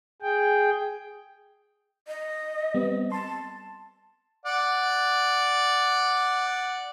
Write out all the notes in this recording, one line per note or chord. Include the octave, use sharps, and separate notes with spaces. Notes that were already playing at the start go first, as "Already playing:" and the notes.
G#4 G5
D#5
G3 B3 C4
A5 C6
D5 F#5